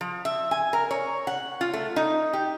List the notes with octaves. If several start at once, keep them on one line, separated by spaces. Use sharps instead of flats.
F3
E5
G#5
A#4
C#5
F#5
F4
A3
D#4
G4